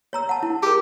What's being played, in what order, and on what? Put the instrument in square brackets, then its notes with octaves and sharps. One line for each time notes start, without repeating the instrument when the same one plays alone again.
[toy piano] C#5 A#5 E6
F#5 A5
E4
[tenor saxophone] G4 [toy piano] G#4 A#4